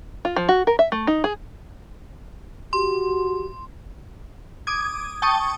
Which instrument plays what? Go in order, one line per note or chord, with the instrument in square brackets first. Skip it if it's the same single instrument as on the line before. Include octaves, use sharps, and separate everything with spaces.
[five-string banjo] F4
F3
F#4
A#4
E5
A3
D#4
G#4
[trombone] F#4 [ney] G4 [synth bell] C6
[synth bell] D6 D#6 G#6
G5 A5 C#6 D#6